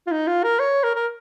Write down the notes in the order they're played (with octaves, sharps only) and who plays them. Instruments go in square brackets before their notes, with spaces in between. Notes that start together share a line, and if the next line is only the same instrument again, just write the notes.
[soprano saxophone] F4
D#4
F4
A#4
C#5
A#4
A#4